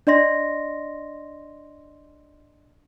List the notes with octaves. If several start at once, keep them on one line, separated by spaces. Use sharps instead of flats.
D4 D5 D#5 C6 A#6